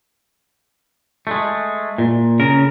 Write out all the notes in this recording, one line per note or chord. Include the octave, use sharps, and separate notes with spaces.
G#3 A3
A#2
C#3 A#4